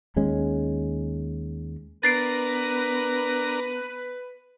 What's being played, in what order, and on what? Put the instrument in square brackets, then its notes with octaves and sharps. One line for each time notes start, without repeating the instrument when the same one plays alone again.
[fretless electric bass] D#2 G#3 C#4
[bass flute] B3 [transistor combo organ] D4 A#4 A#5 [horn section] B4 [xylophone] A6 C7 D7